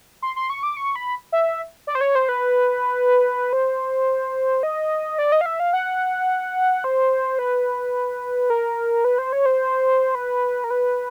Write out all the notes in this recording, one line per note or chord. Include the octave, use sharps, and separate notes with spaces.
C6
C6
C#6
D6
C#6
B5
E5
D5
C5
C#5
C5
B4
C5
D#5
D5
D#5
F5
E5
F5
F#5
C5
B4
A#4
B4
C5
C#5
C5
B4
A#4
B4